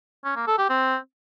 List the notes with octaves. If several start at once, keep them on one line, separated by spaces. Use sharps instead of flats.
C#4
A#3
A4
G4
C4